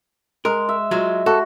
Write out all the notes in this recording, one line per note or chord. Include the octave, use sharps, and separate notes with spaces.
G#3 A#4
E5
F#3 G#3 F4
F#4 A4